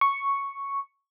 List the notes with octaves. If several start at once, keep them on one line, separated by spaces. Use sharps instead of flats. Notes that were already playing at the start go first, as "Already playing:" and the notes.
C#6